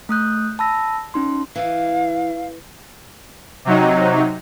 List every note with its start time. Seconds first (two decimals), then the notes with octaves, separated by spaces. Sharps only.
0.09 A3 D#6 F#6 G6
0.59 A5 B5 E6 A#6
1.14 C#4 D#4 C6
1.56 E3 F5
3.65 C3 F#3 D#4